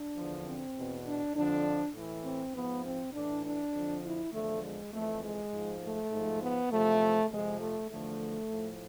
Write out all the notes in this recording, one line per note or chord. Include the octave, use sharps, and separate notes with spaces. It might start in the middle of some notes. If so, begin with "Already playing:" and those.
Already playing: D4
E2 D3 F3
C4
E2 B2
D4
F2 D3 F3 D4
A2 E3
C4
G#2 F3 B3
C4
A2 E3 D4
D4
F2 D3 F3
E4
E2 D3 F3 A3
G#3
F2 E3 A3
G#3
G#2 F3
A3
G#2 F3
B3
E2 C3 F3 A3
F2 C3 F3 G#3
A3
E2 D3 F3 A3
A2 F3